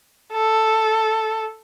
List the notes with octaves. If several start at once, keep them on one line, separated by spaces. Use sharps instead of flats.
A4